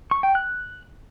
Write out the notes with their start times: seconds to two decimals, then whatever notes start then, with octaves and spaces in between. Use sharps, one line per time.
0.11 C#6
0.23 G5
0.35 F#6